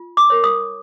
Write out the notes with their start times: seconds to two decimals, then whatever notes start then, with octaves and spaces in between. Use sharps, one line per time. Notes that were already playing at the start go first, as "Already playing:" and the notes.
Already playing: F4
0.17 D6
0.30 A#4 C#5
0.44 D#6